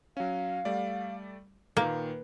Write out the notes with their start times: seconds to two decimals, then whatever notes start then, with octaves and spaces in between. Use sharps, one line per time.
0.17 F#3 C#4 F5
0.65 G3 A3 D5
1.77 A#2 D#3 A#3 B4